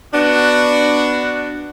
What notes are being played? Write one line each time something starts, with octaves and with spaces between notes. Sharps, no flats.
B3 D4 F#4